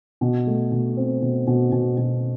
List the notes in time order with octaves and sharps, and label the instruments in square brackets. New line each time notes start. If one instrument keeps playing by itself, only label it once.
[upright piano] B2
A3
B2
C4
B2
B2
B2
B2